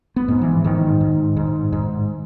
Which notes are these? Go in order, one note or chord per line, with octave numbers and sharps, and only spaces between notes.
B3
G#2
E3
G#2 D#3
G#2
G#2
G#2